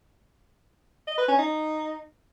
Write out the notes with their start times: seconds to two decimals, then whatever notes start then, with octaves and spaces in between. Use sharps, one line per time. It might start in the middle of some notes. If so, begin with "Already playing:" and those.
1.07 D#5
1.18 B4
1.28 C#4
1.39 D#4